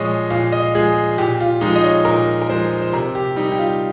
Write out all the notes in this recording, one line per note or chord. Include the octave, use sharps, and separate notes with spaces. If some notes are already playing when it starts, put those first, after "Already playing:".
Already playing: A#2 F3 G#3 C#5 D#5
A#2 F5
D#5
F3 G#3 G#4
A#2 G4
F4
F3 G#3 D#4
D#5
C#5
A#2 A#4
A#4
F3 G#3 C5
C5
C3 A#4
G4
G3 D#4
G4
F4